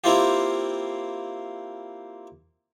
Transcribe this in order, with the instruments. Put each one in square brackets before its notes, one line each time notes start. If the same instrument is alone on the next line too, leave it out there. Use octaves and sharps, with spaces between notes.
[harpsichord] A#3 C4 E4 F4 G4